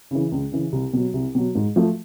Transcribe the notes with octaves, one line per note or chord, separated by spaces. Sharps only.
C#3 E3
C#2
C#3 E3
C2
B2 F#3
C2
B2 F#3
G#2
F3 A3